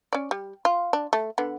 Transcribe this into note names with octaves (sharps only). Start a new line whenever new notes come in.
C#4 D5
G3
F4
D4
A3
D3 B3